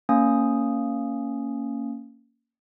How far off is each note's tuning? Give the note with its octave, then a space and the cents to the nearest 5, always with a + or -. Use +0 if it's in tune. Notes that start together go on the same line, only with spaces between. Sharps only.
A#3 -15 C#4 +0 D#6 +0